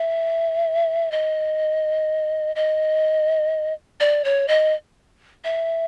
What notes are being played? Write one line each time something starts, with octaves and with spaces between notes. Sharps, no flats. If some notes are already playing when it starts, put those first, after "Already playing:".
Already playing: E5
D#5
D#5
D5
C#5
D#5
E5